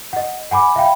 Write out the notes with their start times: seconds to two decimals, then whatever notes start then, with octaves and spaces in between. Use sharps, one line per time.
0.13 D#5 F#5
0.51 F#5 G#5 B5 D6
0.76 E5 F5 G5 B5